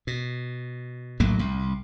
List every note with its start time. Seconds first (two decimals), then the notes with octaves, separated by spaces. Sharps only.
0.07 B2
1.20 A#1 A2 F#3 A#3
1.39 C2